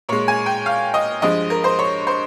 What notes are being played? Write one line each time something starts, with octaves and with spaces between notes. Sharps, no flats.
A#2 G#3 C#5
G#5
G5
F5
D#5
G2 F3 G#3 D#5
A#4
C5
C#5
C5